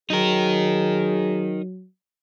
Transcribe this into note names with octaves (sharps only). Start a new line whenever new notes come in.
F#3 D#4 G#4 A#4